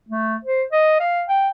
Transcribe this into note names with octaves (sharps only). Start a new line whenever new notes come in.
A3
C5
D#5
F5
G5